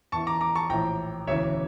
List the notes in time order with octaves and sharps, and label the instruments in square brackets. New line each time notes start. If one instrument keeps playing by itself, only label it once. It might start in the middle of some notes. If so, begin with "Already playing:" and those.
[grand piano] E2 E3 A5 C#6
A#5 D6
A#5 D6
A5 C#6
A#1 A2 E3 G5 A#5
E1 D2 C#3 E3 C#5 E5